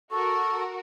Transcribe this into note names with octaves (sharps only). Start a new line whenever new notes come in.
F#4 A4 A#4 C#6